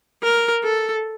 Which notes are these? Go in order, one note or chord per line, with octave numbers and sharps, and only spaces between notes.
A#4
A4